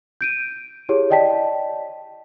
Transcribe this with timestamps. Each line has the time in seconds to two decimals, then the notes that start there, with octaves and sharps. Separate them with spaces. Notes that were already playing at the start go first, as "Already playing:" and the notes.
0.21 G6 D7 D#7
0.89 E4 G4 G#4 C#5
1.10 D5 D#5 G5 A5 B6